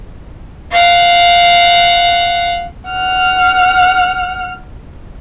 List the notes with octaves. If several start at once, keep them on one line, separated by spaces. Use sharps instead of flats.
F5 F#5
F#5 F6